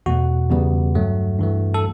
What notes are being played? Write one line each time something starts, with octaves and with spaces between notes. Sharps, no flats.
E2 B2 A3 F#4
E2 C#3 G3 B3
G2 F#3 A3
G2 E3 A3
A4